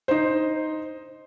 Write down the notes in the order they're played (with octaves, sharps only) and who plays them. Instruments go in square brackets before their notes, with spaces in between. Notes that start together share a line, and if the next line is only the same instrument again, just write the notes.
[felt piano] D#4 C5